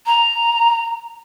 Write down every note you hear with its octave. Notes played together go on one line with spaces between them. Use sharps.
A#5